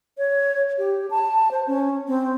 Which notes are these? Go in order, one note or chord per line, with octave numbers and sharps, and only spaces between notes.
C#5
G4
A5
C5
C#4
C4